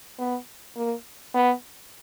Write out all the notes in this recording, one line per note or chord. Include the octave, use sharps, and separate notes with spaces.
B3
A#3
B3